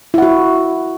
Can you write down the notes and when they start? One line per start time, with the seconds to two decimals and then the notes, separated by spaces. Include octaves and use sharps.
0.14 E4
0.18 F#5
0.22 F#4